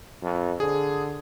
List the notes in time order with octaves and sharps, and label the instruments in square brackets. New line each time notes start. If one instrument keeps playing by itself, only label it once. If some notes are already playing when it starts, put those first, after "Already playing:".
[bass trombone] F2
[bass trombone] D3 [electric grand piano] G#4